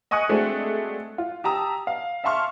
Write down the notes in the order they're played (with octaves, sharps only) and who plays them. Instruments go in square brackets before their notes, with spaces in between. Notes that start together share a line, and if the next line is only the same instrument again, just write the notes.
[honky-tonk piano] D#5 G#5 C#6 D#6 F#6 C#7
G#3 A3 C4 D4 F#4 G#4
F4
G4 A5 A#5 D#6 E6
F5
E5 F5 A5 C6 C#6 F6